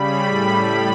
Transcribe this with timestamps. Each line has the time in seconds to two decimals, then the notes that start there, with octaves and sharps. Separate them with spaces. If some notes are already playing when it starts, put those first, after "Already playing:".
Already playing: C#3 G3 B5
0.26 A2 G3